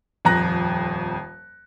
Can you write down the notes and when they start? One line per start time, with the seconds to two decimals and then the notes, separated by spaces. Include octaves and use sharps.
0.25 D#1 F2 A#5 F#6 A#6